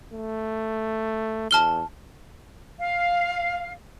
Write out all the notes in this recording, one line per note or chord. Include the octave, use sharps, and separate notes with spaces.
A3
E2 A5 F6 G7
F5